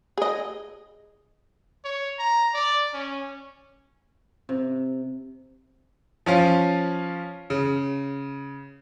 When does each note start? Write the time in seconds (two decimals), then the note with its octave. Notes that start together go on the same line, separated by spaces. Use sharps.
0.17 G#4 D#5
1.85 C#5
2.19 A#5
2.54 D5
2.93 C#4
4.49 C3
6.26 F3 C#4 F4
7.50 C#3